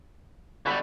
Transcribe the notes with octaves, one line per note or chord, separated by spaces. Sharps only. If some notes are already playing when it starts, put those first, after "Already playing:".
D3 G3 F#4 G4 B5